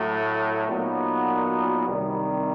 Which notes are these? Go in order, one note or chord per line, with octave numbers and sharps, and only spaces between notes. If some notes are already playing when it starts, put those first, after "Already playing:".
Already playing: A2 F#3 A3
A#2 F#3 B3 D#4 F#4
C2 C3 D#3 G3